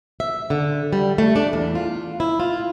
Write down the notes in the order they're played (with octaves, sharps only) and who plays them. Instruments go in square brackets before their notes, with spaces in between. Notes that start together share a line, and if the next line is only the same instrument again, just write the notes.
[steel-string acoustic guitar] E5
D3
G3
A3
D4
E2
F4
E4
F4